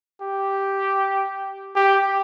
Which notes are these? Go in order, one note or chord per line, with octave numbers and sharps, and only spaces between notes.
G4
G4